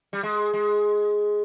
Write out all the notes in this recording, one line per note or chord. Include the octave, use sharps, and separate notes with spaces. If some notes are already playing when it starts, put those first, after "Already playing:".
G3
G#3
G#3